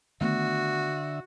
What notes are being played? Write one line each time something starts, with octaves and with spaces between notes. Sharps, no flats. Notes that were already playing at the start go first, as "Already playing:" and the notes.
D3 D#3 A3 B3 F#4 E5